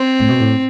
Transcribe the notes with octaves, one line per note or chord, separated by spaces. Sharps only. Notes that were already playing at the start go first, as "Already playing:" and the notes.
Already playing: C4
A2
B2
A2